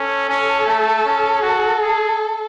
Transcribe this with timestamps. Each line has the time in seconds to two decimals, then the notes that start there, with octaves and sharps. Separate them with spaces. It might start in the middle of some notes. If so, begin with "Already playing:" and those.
Already playing: C#4 A4
0.29 C#4
0.67 A3
1.05 C#4
1.42 F#4
1.81 G#4